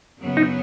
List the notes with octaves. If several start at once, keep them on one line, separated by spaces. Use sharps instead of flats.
F#2 C#3 F#3 B3
D#4